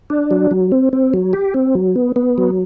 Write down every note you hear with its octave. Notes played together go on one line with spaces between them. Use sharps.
D4
F#3
F#3
C4
C4
F#3
G4
C4
F#3
B3
B3
F#3